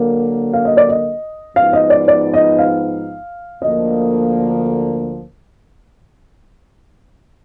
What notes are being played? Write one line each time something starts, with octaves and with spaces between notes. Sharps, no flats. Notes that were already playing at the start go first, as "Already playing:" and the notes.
Already playing: D3 F#3 A#3
F5
D#5
D5
D#5
G#2 F3 B3 D#4 F5
D#5
D5
D5
D#5
F5
D2 D3 F3 A#3 D#5